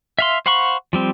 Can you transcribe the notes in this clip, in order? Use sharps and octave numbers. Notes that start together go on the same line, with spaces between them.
E5 F5 C6
C5 F5 F#5 B5 C#6
F3 G3 C4